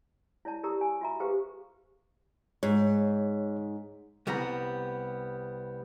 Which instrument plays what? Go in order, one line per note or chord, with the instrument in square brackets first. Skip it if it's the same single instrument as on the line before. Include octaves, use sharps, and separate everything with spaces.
[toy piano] E4 C#5 D5 A5
E4 G4 A#4 D5 A#5 D#6
G#5
F4 F#4 E5 A#5
G4 G#4 B4 C5 F5 C#6
[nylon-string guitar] G#2 [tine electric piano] C#5
[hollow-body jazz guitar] C2 G3 B3 A#5